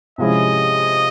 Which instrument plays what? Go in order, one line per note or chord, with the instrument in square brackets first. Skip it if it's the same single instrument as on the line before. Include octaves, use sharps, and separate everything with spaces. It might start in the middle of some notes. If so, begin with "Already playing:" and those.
[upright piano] C3 F3 G#3 C#4 E4 [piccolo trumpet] D#5